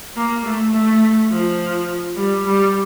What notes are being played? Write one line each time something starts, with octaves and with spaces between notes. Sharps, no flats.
A#3
A3
A3
F3
G3
G3